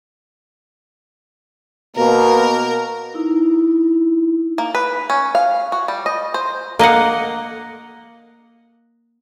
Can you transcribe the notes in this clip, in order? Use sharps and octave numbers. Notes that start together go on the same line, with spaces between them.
B2 A#3 A#4
D#4 E4
A#3
B4
C#4
F5
F#4
G3
D#5
C5
A#3 D#5 F5 F#5